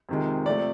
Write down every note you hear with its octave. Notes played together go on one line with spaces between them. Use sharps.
F2 C3 D#3 G#3
C3 F3 A3 D5